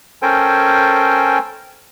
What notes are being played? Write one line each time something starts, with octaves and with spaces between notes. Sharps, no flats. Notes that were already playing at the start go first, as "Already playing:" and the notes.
C#4 A4 A#4 C5 G5 G#5